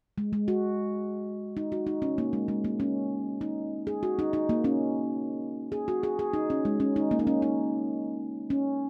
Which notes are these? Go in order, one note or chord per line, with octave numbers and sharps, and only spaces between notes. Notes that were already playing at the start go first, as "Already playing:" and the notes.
G#3
G#3
F#4
D#4
F#4
D#4
C#4
A#3
G#3
G#3
A#3
C#4
D#4
G#4
F#4
D#4
D#4
A#3
C#4
G#4
F#4
G#4
G#4
D#4
C#4
G#3
C#4
D#4
A#3
D#4
C#4
D#4
C#4